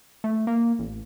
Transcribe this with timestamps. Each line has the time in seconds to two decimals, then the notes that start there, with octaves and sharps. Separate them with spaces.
0.24 A3
0.47 A#3
0.79 A1